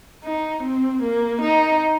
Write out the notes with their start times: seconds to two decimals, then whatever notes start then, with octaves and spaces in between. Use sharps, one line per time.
0.24 D#4
0.63 C4
1.03 A#3
1.41 D#4